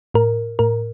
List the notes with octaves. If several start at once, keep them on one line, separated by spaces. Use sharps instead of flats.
A2 A#4
A2 A#4